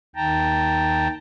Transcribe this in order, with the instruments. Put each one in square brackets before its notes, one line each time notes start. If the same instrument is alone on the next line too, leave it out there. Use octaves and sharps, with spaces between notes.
[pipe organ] D#2 D#3 G5 A5 A#5